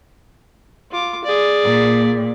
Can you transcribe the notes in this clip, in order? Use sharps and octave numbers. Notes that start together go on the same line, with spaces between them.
F4 D6
G#4 D5
A#2